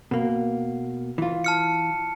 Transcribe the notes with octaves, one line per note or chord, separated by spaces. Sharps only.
B2 A#3
E3 F4
A5 F6 C#7